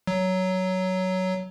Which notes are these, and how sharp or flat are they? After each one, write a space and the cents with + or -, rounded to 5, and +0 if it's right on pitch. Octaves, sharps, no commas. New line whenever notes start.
F#3 +10